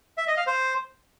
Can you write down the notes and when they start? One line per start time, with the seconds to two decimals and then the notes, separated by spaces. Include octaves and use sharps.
0.18 E5
0.27 D#5
0.37 F5
0.47 C5